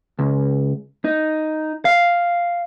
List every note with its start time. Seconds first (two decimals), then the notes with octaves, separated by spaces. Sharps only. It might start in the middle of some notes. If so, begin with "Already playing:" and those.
0.19 C#2
1.04 D#4
1.85 F5